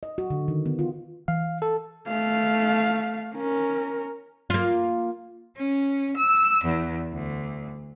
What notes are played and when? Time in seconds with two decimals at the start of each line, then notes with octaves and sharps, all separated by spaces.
0.03 D#5
0.18 F#4
0.30 D3
0.48 D#3
0.66 B3
0.79 F4
1.28 E3 F5
1.62 A4
2.08 A3 F5
3.35 C#4 A#4
4.50 A#3 F4
5.57 C#4
6.17 E6
6.64 E2
7.14 D2